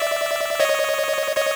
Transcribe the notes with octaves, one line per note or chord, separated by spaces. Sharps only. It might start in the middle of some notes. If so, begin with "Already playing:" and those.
Already playing: D5 E5
C#5 D#5
C#5 D#5